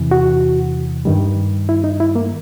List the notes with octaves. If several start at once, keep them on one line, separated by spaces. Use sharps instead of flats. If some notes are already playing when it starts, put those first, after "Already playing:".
Already playing: E2 C3 E3
F#4
G2 D#3 G3
E4
D#4
E4
A#3